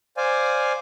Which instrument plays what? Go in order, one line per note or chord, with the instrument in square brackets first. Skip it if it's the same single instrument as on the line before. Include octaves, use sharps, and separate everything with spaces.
[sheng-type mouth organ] C5 D5 F5 G#5